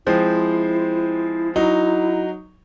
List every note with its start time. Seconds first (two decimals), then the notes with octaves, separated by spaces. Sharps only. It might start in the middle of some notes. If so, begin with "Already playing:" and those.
0.07 F3 G#3 C4 E4
1.56 F#3 D#4 E4